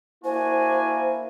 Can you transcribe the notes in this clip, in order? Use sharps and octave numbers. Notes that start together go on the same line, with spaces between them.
A#3 D4 E4 F#4 C5 G#5